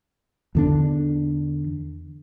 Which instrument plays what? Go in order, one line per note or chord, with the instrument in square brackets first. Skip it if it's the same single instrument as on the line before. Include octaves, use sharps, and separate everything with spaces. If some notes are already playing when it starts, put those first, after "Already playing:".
[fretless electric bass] E2 D3 D4